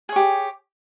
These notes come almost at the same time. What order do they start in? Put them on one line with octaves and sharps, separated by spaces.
G#4 C#5 G4